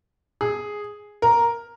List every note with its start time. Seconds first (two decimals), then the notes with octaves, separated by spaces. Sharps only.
0.41 G#4
1.22 A#4